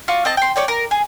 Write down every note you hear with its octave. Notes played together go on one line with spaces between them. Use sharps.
F4 F#4 D5
C4 D#5 A5
G5 C6
C#5 D5 G5
A#4
G#4